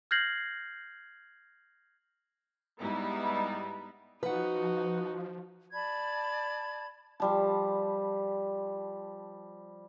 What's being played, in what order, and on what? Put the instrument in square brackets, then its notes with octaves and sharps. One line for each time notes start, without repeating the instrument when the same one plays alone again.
[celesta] F6 G6 G#6 A#6 C7 F#7
[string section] G#2 G3 B3 D#4 E4
[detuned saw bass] F3 [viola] D#4 F#4 [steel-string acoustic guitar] B4 F#5
[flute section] D5 A5 B5 G#6
[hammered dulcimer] F3 G3 A5